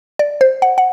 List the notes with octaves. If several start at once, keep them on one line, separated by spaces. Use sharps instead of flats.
D5
C5
F#5
F#5